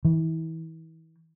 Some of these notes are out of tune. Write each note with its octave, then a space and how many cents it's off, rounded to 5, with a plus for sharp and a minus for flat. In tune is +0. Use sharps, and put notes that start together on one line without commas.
E3 -35